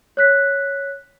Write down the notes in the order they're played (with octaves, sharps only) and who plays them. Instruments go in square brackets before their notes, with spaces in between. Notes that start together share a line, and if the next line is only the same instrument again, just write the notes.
[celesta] C#5 F#6 B6